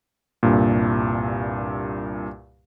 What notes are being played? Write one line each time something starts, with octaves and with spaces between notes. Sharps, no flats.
C2 G2 A#2